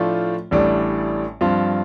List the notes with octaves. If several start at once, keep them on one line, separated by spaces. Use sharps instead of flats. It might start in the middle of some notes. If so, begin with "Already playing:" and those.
Already playing: A2 F3 A3 D4 F4
A1 A2 G3 D4
G2 F3 C4 F4